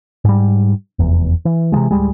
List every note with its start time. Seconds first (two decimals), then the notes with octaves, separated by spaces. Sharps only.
0.25 G#2 G3
0.99 F1 E2
1.45 E3
1.72 C3 E3 F3 G#3
1.91 D1 G1 G3 G#3